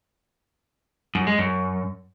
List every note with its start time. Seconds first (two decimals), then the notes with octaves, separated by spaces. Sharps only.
1.15 F#2
1.27 G#3
1.39 F#2